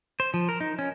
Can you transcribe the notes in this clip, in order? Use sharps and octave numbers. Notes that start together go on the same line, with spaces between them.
C5
F3
A#4
D#4
C#4